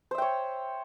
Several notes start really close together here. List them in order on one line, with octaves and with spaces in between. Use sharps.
C5 E5 G5 C#5